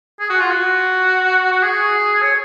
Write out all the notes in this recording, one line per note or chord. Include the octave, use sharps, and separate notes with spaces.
G#4
F#4
F4
F#4
F#4
G#4
C#5